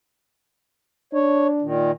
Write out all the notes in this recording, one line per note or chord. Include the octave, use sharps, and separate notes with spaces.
D4 C#5
A#2 D#3